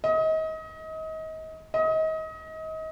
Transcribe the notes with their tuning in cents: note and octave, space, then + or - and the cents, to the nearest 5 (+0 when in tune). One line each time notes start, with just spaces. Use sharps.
D#5 +30
D#5 +30